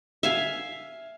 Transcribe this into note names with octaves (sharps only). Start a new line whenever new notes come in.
E5 F5 G#5